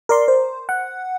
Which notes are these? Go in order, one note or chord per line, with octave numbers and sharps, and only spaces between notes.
A#4 D5 C6
C5
F#5